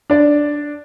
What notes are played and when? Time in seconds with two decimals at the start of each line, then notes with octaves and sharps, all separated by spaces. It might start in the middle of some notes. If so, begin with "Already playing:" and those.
0.10 D4 D5